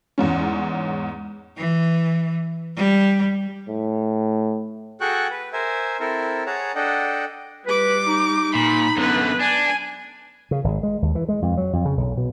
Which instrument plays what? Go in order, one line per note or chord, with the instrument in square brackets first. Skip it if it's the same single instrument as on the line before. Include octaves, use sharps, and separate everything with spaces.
[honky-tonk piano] E2 G#2 C#4
[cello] E3
G3
[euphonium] A2
[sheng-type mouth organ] F#4 G#4 A4 G5 C#6 F#6
B4
A#4 C5 E5 G#5
C4 E4 A4 A#4
G#4 C#5 F#5 A5 A#5
D4 A4 D#5 F#5 G5
[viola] G3 D6 [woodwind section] B4
[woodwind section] D#4
[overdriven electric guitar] A#2 [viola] B5
[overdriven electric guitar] F#2 D3 [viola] B3 B4
[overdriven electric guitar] D4 [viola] G#5
[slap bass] C#3
G#1
G#3
D#2
E3
G#3
F2
F#3
F2
C#3
B1
B2